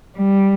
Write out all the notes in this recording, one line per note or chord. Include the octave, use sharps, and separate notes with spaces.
G3